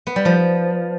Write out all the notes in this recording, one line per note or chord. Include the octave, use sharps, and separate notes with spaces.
B3
G3
F3